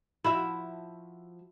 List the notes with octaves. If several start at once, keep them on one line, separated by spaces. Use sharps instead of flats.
F3 E4 F#4 E5